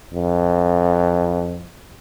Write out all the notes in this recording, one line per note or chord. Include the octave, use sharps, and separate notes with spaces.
F2